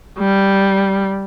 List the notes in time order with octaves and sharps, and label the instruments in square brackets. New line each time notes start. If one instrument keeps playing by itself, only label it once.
[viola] G3